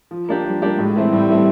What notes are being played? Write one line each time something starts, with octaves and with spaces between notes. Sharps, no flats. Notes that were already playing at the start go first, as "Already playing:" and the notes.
F3
A#3 D4 G4
F3 G3
A#3 D4 G4
A2 G#3
E3 A3 C4 E4
A2 G3
E3 A3 C4 E4